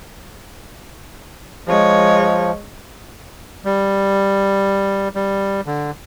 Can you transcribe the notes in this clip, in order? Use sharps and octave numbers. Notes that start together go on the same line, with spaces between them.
F3 G#3 C#5
G3
G3
D3